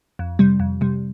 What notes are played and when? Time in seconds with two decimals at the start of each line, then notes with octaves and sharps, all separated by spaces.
0.19 F2
0.39 C3 G3
0.60 F2
0.81 C3 G3